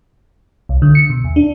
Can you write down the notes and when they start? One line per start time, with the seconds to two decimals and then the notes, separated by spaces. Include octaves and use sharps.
0.69 C2
0.82 D3
0.95 C#7
1.10 B2
1.24 D#2
1.36 D4